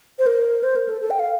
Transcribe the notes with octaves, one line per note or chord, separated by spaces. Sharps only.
C5
A#4
C5
A#4
A4
A4
G5
F5